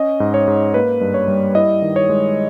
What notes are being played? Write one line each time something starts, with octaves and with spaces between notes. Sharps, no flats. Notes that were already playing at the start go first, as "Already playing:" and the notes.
Already playing: C#4 D#5
G#2
C#5
G#2
A#3 B4
G2
C#5
G3
E4 D#5
D#3
C#5
G#3